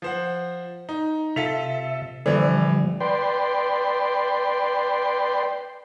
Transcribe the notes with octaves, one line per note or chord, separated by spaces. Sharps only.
F3 C5 F#5
D#4
C3 F4 A4 E5 F7
A#1 D3 E3 F3 G3
B4 D5 G5 C6